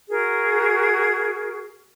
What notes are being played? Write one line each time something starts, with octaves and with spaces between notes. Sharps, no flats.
F#4 G#4 A#4